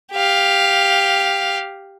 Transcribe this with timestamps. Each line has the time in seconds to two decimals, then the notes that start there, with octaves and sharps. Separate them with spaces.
0.12 G4 F5